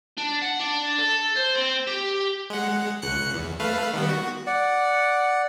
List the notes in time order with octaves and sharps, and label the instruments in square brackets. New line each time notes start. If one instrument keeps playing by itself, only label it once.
[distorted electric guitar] D4
F#5
D4
A4
C5
C4
G4
[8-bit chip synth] G#3 F#5
C#2 F#6 C#7
E2
A3 B4 F5
D#3 G3 B3
F#4
[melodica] D5 F#5